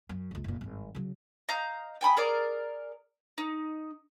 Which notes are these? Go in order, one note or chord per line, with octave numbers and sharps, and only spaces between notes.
F#2
F#1 C#2
F#1 A#2
G#1 G2
C#3 F#3
D#5 F5 A#5 G6
G5 G#5 B5 D#6
G#4 A#4 D5
D#4